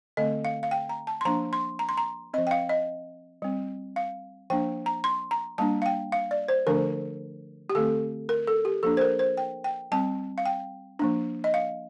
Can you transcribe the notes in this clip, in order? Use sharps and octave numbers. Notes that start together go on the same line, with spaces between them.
D3 A3 C4 D#5
F5
F5
G5
A#5
A5
C6
F3 A#3 D4 A#5
C6
A#5
C6
A#5
F3 C4 D#5
G5
F5
D#5
G3 C4
F5
F3 A#3 D4 G5
A#5
C6
A#5
G3 A#3 D4 A5
F5
G5
F5
D5
C5
D3 F3 A3 D4 A#4
G4
D3 A3 C4 A4
A#4
A4
G4
F3 A#3 D4 A4
C5
A#4
C5
G5
G5
G3 C4 A5
F5
G5
F3 A#3 D4
D#5
F5